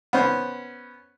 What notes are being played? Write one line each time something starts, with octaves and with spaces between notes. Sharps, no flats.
B3 C#4 C5